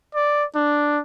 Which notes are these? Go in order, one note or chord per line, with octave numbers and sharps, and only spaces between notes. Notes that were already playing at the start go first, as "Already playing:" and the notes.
D5
D4